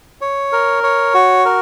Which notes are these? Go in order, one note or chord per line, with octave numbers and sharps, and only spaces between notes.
C#5
A#4
C#5
F#4
A#4